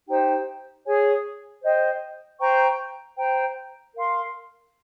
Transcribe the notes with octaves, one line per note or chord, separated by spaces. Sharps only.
D#4 G4 C5 G5
G#4 C#5 G#5
C5 D#5 G5
C5 G5 A#5 C#6
C5 G5 A#5
A#4 F5 C6